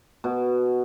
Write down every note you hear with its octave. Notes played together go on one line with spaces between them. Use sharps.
B2